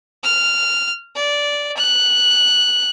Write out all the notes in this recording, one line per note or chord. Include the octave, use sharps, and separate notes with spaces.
F6
D5
F#6